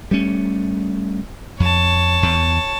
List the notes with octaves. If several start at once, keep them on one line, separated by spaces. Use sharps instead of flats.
G3 A3 C#4
F2 C#5 A5
E2